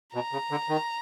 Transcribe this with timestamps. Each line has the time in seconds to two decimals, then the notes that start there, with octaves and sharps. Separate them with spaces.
0.14 B2 A#5
0.32 C#3
0.51 D3
0.69 D#3